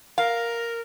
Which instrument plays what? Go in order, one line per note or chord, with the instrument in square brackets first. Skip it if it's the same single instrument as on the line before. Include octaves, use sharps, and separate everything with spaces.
[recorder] A#4 [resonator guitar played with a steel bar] F5